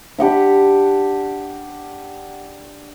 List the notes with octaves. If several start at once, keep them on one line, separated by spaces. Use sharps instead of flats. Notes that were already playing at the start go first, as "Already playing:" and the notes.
D4 G4 F#5 B5